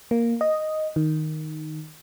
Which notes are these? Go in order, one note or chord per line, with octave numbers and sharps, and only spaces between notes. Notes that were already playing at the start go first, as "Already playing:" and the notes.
A#3
D#5
D#3